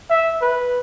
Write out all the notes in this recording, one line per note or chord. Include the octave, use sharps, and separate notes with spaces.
E5
B4